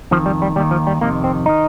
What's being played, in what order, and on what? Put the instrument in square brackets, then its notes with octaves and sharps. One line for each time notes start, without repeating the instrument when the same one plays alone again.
[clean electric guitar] F2 D#3 F3
G3
G3
D#2 G3
D#3
F3
G3
F2 C3 D#3 A#3
C4
D#3 D#4